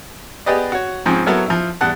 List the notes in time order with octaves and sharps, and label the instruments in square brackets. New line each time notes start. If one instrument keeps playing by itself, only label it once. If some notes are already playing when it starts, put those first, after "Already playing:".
[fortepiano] B3 G4 G#4 B4 D5 D#5
F#4 C#5
G#2 F3 C4 C#4
F#3 B3 E4 A4 A#4 C#5
F3 E4
E2 G3 F#5 A5 F#6